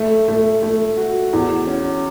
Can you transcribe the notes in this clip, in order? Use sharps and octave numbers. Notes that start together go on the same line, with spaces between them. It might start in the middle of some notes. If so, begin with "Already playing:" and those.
Already playing: A3
A3
A3
F#4
E2
C#4